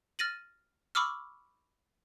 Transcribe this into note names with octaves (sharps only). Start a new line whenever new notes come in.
F6 A6 A#6 D#7 F#7
B5 C#6 D6 E6 F6